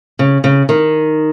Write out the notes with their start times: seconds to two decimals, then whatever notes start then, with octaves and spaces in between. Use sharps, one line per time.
0.19 C#3
0.44 C#3
0.69 D#3